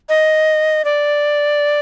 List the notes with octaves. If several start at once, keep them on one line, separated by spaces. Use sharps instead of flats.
D#5
D5